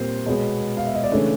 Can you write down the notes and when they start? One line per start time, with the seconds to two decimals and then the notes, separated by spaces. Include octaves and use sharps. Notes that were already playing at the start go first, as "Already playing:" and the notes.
Already playing: A#2 G3 C4 C5
0.26 B2 G#3 B3 C#5
0.77 F5
0.86 E5
0.95 D#5
1.04 D5
1.12 C#3 E3 A3 D4 C#5